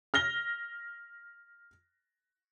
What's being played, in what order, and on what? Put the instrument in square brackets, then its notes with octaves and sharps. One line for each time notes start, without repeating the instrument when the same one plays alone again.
[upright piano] F6 A#6 G7